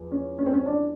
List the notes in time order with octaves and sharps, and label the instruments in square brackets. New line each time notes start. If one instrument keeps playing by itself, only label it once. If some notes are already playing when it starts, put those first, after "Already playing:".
Already playing: [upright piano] E2 F3
C#4
C#4
C4
C#4
D4